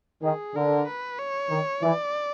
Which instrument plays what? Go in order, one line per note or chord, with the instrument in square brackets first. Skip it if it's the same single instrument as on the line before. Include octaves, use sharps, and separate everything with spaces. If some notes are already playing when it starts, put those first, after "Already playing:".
[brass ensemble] D#3 [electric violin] G#4
[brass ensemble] D3 [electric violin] A#4
[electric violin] B4
C#5
[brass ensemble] D#3
[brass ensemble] E3 [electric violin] D5